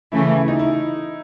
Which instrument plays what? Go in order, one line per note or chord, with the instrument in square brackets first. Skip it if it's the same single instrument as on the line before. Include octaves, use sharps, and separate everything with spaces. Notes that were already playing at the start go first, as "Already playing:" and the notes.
[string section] C#3 E3 A3 [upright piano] E4
[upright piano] E4
D#4
E4